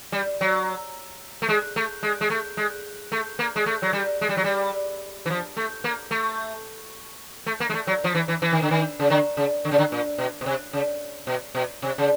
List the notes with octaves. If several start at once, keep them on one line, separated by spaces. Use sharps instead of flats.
G3
F#3
A3
G#3
A3
G#3
G#3
A3
G#3
A3
A#3
G#3
A3
F#3
G3
G#3
G3
F#3
G3
E3
F3
A3
A#3
A3
A3
A#3
G#3
A3
F#3
F3
E3
E3
E3
D#3
D3
D#3
C#3
D3
C#3
D3
C#3
D3
A#2
B2
B2
C3
C#3
B2
B2
C3
C#3